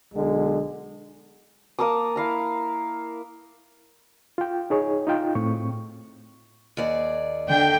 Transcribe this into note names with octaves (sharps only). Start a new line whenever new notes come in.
B1 D3 G#3
A#3 A#4 A5 D#6
E4 F5 A#5
F4 G5
D#4 G#4 C#5
D#4 F4 G5
A2 C4 C#6
D#2 G#4 D5
D3 G5